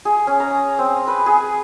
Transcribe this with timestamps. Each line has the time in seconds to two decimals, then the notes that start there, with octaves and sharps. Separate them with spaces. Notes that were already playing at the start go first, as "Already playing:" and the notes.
0.05 G#4
0.27 C#4
0.40 A#5
0.79 C4
1.07 B4
1.26 G#4